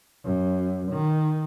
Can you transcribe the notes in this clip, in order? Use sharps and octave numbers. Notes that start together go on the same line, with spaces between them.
F#2
D#3